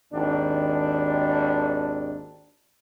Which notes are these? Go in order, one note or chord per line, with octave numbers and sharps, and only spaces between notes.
G#1 D#2 D#3 D4